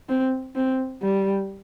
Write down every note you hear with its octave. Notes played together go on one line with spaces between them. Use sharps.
C4
C4
G3